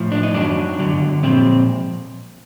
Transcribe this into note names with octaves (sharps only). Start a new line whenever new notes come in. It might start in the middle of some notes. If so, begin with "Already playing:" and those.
Already playing: A2 F3
D4
D#4
F#2 D#3 F#3 D4
G2 D3 F#3
A#2 F3 C4